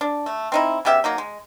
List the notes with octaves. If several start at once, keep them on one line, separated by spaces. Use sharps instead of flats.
D4
A3
C4 D#4 E4
C#3 B3 G4 E5
F#3 A#3 D#4
G#3